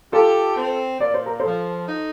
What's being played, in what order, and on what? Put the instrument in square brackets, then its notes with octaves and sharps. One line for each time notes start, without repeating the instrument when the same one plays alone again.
[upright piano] F4 A4 [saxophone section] G4
[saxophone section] C4
[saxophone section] A#2 [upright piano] D5
[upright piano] C5
A#4
A4 C5
[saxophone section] F3
D#4